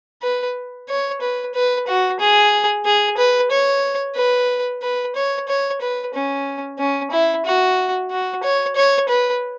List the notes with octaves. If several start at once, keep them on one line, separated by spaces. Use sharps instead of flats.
B4
C#5
B4
B4
F#4
G#4
G#4
B4
C#5
B4
B4
C#5
C#5
B4
C#4
C#4
E4
F#4
F#4
C#5
C#5
B4